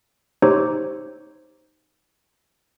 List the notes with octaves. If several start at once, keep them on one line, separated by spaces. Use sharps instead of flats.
D#4 G4 C5 C#5